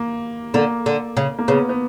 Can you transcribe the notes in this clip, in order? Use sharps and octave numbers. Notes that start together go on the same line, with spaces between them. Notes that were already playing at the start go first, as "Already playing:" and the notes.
Already playing: A#3
D3 A#3
D3
C#3
A#3
C#3 B3
B3